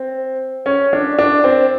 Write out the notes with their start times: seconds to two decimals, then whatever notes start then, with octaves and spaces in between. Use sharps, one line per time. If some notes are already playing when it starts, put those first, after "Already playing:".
Already playing: C4
0.66 C#4
0.93 D4
1.19 D4
1.44 C4